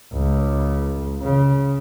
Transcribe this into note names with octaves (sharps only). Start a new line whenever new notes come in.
C#2
C#3